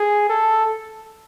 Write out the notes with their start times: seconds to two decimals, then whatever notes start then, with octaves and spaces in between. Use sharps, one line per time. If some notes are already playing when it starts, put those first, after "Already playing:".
Already playing: G#4
0.29 A4